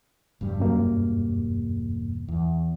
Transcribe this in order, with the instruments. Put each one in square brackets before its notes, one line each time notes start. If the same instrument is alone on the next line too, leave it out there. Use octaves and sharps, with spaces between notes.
[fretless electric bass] E1 G2 G3
[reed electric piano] F#2 A#3
[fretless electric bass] E2